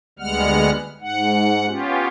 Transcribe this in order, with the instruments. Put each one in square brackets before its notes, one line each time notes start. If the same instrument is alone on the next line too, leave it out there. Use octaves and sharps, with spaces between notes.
[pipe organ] D2 G3 G#3 B3 F#5 F6
G#2 F#5
B3 C#4 F4 G4